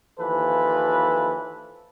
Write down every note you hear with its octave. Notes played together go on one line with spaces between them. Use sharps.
D#2 E3 F3 A4 B4